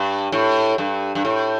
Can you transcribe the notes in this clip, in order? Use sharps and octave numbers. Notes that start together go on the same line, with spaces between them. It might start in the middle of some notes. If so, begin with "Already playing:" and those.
Already playing: G2
A2
G2
G2
A2